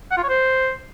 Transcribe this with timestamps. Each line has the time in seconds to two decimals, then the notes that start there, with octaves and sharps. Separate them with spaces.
0.11 F#5
0.17 F4
0.23 C#5
0.29 C5